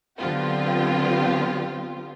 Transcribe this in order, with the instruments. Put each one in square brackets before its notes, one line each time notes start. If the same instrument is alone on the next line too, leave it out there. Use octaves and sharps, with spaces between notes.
[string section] D3 F#3 B3 C4 F4 G4